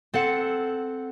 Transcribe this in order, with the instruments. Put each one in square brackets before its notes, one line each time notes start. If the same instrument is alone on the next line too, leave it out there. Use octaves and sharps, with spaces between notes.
[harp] C4 A4 F#5